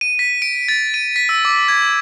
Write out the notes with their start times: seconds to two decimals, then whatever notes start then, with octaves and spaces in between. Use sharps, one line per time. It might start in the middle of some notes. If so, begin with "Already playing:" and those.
0.01 D#7
0.19 B6
0.42 D7
0.68 A6
0.94 D#7
1.16 B6
1.29 E6
1.45 D6
1.68 G#6